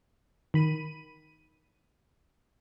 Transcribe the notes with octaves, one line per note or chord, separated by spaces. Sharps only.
D#3 B5 D#7